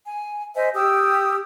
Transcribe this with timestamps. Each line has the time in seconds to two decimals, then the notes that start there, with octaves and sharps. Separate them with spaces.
0.04 G#5
0.55 C5 D#5 E5 G#5
0.74 G4 G5 D#6 E6